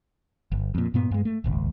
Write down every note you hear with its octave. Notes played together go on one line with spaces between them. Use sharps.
G1
F2 A#2
G2 A#2 B3
G2 G#3
A3
D#1 G#1 C#2